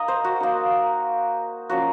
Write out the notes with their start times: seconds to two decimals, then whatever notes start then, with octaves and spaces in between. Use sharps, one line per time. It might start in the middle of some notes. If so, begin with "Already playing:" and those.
Already playing: A#3 D#4 A#4 D#5
0.08 C5
0.24 F#4
0.40 A#3 D#4
1.70 F3 A#3 C#4 F#4